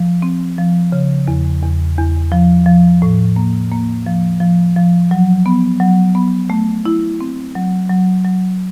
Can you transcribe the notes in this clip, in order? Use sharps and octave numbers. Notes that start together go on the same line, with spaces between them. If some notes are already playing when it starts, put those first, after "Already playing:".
Already playing: F3
C4
F3
C#3
E2
E2
E2
F3
F3
A2
A#3
A#3
F3
F3
F3
F#3
B3
F#3
B3
A3
E4
C4
F#3
F#3
F#3